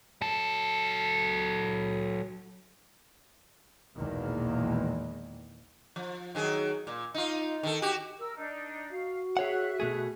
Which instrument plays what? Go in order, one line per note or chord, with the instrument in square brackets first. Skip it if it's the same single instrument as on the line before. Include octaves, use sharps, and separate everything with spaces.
[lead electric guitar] F#3 A4
[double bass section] A#1 E2 B2 D#3 G#3 A#3
[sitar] F3
D#3 F#3 G#4
A#2
D#4 F4
D#3 A4
F#4 G4
[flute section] A#4 E6
D4 D#4
[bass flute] F#4 [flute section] F5
[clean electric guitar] G#4 C#5 F#5 [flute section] E5 F#6
[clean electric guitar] B2 A3 G#4